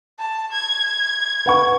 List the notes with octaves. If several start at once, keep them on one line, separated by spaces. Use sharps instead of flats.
A5
G#6
B4 F#5 C#6